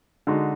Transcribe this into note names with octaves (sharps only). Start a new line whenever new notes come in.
D3 G#3 D#4 F#4